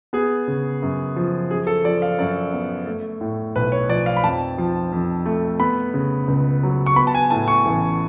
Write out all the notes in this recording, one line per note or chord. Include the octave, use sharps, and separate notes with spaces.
B3 G#4
C#3
F#2
F3
F#2 G#4
A4
F3 D5
F5
F#2 D5
B3
A3
A2
B1 B4
C#5
F3 D5
F5
B5
F2 A5
F3
F2
A3
B3 B5
C#3
C#2
F#3
C#6
B3 B5
A5
G#5
A2 A5
C#6
A1